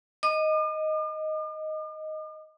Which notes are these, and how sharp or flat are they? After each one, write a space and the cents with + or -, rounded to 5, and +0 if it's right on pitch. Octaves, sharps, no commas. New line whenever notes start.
D#5 +0 D6 +45